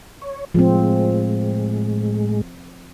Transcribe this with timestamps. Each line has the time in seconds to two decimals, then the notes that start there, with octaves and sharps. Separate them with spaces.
0.22 C#5
0.55 A2 F3 G#3 C4